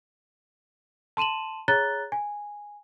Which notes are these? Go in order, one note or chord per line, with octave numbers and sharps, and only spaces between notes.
A5 C6 D#7 E7 F#7
G#4 C#5 A#5 F#6 A6 G7
G#5